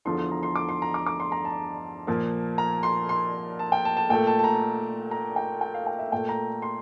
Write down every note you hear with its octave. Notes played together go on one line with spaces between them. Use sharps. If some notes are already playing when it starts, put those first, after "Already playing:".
E2 D3 F3 C6
C6
A#5
C6
D6
C6
A#5
D6
D6
C6
A#5
A5
A#2 F3 A#3
A#5
C6
C6
A5
G5
A5
A5
A#2 A3 G5
A5
A5
A#5
A#5
G5
G5
F5
G5
E5
A#2 A3 G5
A#5
C6